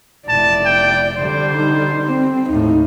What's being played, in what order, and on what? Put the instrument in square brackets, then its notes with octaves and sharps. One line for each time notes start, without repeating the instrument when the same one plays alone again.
[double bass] F1 E4 [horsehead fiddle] D5 [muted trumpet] A5
[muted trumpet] G5
[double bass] D3 G3 [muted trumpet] C5
[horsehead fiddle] D#4
C4
[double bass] D#2 A2 [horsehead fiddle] D#4